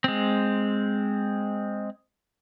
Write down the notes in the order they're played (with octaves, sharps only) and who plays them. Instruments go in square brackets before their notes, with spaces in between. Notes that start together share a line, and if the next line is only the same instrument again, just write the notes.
[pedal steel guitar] G#3 C4